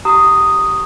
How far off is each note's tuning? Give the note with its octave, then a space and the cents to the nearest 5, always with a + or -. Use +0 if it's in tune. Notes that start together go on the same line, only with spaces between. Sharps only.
G4 -20 A#5 -25 D#6 +0